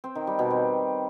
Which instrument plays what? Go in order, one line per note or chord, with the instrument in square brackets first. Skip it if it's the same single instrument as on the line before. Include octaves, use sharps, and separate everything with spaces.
[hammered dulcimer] C4
D#3
G3
B2
C4